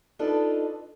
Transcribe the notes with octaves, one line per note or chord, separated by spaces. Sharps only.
D4 D#4 F4 A4 B4 D#5